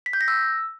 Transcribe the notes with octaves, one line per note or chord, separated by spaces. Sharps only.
B6
G6
A#6
E6